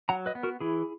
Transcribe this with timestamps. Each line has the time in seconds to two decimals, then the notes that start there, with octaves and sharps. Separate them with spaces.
0.09 F#3 F#5 A#5
0.26 B4 D#5
0.35 B3
0.43 F#4 A#4
0.60 E3 E4 G#4